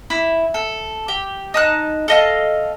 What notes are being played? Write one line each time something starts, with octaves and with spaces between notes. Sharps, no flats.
E4
A4
G4
D#4 A5 F#6
A4 D#5 F5